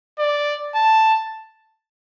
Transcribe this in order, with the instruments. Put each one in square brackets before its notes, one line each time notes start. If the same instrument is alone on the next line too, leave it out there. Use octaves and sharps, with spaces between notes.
[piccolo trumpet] D5
A5